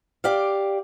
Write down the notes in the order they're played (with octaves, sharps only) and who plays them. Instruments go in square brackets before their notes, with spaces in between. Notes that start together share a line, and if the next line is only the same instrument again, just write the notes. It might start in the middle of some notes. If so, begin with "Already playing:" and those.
[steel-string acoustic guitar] G4 D5 F5